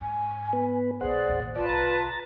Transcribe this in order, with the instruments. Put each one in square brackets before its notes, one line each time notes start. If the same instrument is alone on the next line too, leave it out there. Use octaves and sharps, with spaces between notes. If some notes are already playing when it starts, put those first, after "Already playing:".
[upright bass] G#2 [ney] G#5
[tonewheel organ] B3 B4
[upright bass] B1 B2 [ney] G#4 [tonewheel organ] C5 F#5 [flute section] D5
[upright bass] A1 D#2
[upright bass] G2 [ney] F4 [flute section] B4 A5 [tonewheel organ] D5
[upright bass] C2 [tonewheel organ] A#5 A6